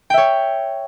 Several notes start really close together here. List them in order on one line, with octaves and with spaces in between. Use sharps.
G5 E5 C#5